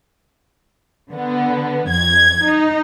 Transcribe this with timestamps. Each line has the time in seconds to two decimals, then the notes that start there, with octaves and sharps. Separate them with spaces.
1.11 D3 B3
1.89 F2 G#6
2.44 D#4